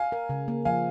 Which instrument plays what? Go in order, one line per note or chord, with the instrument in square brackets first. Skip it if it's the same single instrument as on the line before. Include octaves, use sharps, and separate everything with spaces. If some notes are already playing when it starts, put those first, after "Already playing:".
Already playing: [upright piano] F5 G#5
[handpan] A#4
C#3
A#3
[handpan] F3 [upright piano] F5 G#5